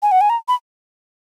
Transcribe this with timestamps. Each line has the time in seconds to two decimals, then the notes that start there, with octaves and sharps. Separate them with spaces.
0.02 G#5
0.12 F#5
0.21 G#5
0.30 A#5
0.48 B5